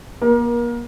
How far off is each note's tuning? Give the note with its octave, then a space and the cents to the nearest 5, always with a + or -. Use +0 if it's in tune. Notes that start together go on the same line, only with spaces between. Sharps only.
A#3 +40 A#4 +30